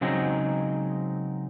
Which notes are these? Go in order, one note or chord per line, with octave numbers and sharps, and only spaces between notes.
C#3 F#3 G#3 C4 D#4